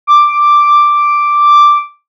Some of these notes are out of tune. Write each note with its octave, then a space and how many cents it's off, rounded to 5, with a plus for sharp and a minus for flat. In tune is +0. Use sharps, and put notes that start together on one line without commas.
D6 +0